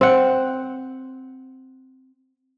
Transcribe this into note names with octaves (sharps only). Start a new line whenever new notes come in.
C4 F#5